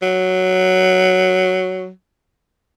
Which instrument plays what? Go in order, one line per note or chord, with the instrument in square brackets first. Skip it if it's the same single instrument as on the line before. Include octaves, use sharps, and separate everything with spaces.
[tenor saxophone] F#3